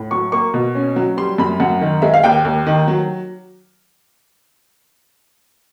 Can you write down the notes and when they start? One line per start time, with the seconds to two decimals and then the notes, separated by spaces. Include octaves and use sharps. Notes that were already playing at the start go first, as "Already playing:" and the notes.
Already playing: A2
0.11 F#3 C#6
0.32 A#3 C#6
0.54 B2
0.75 C#4
0.96 F#3
1.17 G3 C6
1.38 F#2 B5
1.60 F#2 F#5
1.81 D#3
2.02 G#3 E5
2.14 F5
2.24 D#2 G5
2.45 D#2
2.67 D#3
2.88 F#3